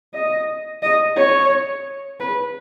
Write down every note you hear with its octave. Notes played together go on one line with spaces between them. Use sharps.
D#5
D#5
C#5
B4